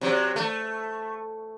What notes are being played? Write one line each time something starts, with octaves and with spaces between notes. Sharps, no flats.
C3 F#3
A3